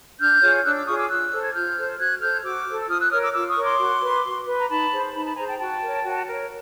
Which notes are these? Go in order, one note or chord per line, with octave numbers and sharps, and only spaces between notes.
D4 F6 G6
F4 G#4 C#5
D4 E6 F#6
D6 E6
F4 G#4 C#5 C#6 D#6
D6 E6
F4 E6 F#6
A4 C5
G#6
F4 F6 G6
A4 C5
F#4 F#6 G#6
A4 C5 F6 G6
F#4 D6 E6
A4 C5
E6
F4 D#6 F6
E6 F#6
A#4 C#5 D#6 F6
D6 E6
F4 D6 E6
C#6 D#6
A#4 C#5
C6 D6
F#4
B4
F#4
B4
A#5
D#4 A5 B5
G#4 C5
D#4 A5 B5
A5 B5
G#4 C5 G#5 A#5
G5 A5
F#4 G5 A5
A#4 C#5
F#4
A#4 C#5